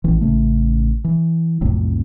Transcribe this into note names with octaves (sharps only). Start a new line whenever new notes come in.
A1 E3
A1 C#3 A3
E3
B1 F2 A2 C3